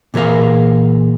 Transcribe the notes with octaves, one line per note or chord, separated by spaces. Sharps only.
A#2 E3 G#4 A#4 F5